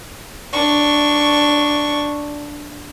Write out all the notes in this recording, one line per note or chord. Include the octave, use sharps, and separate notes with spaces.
D4 C#6